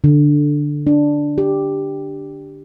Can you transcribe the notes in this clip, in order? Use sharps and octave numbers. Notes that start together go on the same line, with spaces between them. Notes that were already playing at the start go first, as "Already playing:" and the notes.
D3
D4
G4